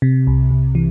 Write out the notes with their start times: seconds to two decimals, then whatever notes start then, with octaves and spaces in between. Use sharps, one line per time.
0.02 C3
0.27 C2
0.51 C2
0.75 E3